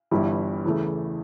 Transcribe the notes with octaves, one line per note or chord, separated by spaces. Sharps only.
G1 G2 E3 G3
E2 C#3 E3 A3